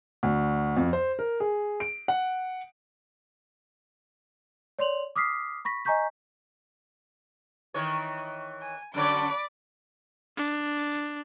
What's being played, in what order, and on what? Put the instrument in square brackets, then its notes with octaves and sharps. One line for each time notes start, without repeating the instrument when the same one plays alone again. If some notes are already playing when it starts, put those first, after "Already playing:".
[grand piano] D2
F2
C5
A#4
G#4
D7
F#5
[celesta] C#5 D5 C6 F7 F#7
D6 D#6 F6 B6 C7
B5 C#6 A#6 B6
D#5 G#5 A#5 C#6 G6 B6
[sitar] D#3 E3 C#5
[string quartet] G#5
[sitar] F#2 D3 C#5 [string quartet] D5 B5 D6
[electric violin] D4